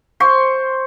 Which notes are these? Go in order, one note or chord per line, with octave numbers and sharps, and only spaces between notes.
C5 C6 C#6